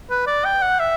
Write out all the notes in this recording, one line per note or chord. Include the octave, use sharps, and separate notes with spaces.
B4
D5
G5
F#5
E5